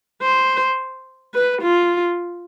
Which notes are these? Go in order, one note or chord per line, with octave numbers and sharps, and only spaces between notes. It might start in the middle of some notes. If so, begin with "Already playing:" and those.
C5
B4
F4